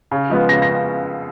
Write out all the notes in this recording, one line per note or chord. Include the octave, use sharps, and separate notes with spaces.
C#3
F3 G#3 B3
C#3 A#6
A#6